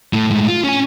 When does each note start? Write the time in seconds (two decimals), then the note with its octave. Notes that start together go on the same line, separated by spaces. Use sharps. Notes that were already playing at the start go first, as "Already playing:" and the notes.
0.13 A2 A3
0.30 A2 G#3
0.48 F4
0.64 C#4 G#5